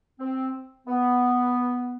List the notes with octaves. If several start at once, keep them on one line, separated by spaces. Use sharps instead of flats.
C4
B3